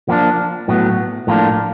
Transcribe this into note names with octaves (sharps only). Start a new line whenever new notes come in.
F3 A#3 D4
A2 F#3 B3
A2 F3 A#3 D4